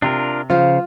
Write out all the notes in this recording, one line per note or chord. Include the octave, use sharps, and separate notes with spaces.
C3 D4 F4 A#4
C#3 F3 F4 C5 F5